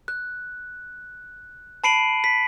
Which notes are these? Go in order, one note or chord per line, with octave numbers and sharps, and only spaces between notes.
F#6
A5 B5 C7 D7 D#7 F#7
B6